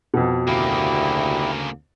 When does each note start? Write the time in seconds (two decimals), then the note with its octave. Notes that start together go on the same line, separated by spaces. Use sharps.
0.14 F2 B2
0.47 D2 C#3 A#3 E4 G4